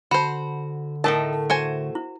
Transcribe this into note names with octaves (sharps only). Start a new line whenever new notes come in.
D3 F#4 C5 A5 B5
A2 D#3 A3 A#4 D#5 A5
F#4 C5 G#5
E4